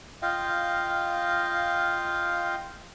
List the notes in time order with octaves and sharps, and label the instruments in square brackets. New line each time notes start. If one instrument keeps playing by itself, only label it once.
[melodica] F4 D#5 F5 G5